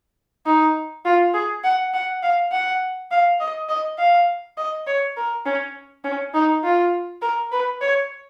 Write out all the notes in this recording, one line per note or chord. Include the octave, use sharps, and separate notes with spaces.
D#4
F4
G#4
F#5
F#5
F5
F#5
F5
D#5
D#5
F5
D#5
C#5
A#4
C#4
C#4
D#4
F4
A#4
B4
C#5